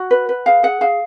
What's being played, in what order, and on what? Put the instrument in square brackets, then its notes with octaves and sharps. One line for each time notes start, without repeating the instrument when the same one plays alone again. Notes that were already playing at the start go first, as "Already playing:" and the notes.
Already playing: [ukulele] F#4 F#5
B4
B4
G#4 F5
G#4 F#5
G#4 F5